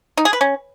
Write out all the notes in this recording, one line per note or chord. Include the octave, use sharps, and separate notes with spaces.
D#4
G#4
B4
C#4